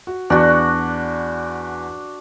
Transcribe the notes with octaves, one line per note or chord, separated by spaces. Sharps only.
F#4
E2 D4 F#4